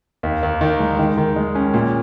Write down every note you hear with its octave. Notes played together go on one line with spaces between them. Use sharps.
D#2
D#2
D#3
G#3
D#3
D#3
G#3
C#4
A#2